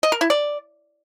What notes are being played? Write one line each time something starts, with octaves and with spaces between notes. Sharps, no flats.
D#5
A#4
E4
D5